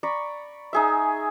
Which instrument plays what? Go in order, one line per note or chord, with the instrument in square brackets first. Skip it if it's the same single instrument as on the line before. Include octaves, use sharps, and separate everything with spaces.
[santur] D5 A#5 B5 C#6
D#4 G#4 E5